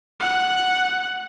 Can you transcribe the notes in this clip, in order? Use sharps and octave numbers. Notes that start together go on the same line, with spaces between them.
F#5 F#6